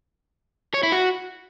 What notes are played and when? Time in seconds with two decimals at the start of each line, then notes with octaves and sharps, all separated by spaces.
0.74 C#5
0.83 E4
0.92 F#4